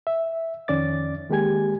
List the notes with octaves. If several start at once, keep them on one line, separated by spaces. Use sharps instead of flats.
E5
F2 D#3 C#4 D5 D6 A6
D#3 G#3 A#3 G4 G#5 G#6